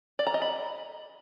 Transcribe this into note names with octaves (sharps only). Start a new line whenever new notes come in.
D5
A#5
D#5
B5